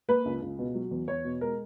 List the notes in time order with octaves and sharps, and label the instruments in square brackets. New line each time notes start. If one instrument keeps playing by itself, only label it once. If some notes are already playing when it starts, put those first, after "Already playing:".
[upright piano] A#3 B4
C#2
C#2
B2
F#3
E2
E2 C#5
B2
G#3 A#4